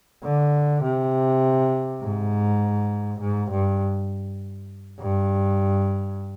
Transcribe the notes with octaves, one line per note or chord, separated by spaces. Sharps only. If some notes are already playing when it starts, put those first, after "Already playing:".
D3
C3
G#2
G#2
G2
G2